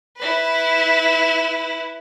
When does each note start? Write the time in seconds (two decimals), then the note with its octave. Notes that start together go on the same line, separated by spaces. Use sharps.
0.17 E4 B4